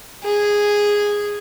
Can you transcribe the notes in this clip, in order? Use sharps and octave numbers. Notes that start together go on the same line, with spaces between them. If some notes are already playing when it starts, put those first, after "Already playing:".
G#4